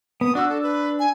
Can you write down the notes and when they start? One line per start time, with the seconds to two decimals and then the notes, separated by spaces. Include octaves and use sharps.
0.21 B3 D#6
0.35 D4 F#4 E6
0.49 A4
0.63 B4
1.00 G#5